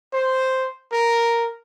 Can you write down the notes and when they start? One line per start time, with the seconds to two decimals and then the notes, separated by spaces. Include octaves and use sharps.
0.13 C5
0.92 A#4